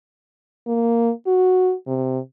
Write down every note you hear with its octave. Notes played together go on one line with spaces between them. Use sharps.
A#3
F#4
C3